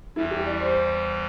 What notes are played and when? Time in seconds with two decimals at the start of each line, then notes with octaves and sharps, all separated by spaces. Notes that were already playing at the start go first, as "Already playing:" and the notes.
0.16 E2 E3 G3 E4
0.31 G4
0.46 D5
0.60 C5